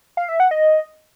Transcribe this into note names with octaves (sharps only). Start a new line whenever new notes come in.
F5
E5
F#5
D#5